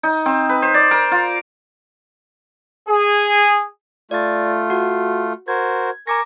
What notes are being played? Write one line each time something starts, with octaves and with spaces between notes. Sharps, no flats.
D#4
C4
B4
C5
D5
A#4
F4
G#4
A3 F4 D5 A6
F#4 F#5
F#4 A#4 C5 G#6
A#4 G#5 A#5 C#6 D6 A#6